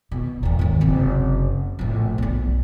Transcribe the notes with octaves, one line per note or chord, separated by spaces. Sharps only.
B2
E2 A#2
D#2 G#2
F#1 C3
A#1 A2
B1 D4